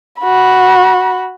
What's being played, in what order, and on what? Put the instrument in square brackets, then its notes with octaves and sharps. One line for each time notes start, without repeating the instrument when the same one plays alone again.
[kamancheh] F#4 B5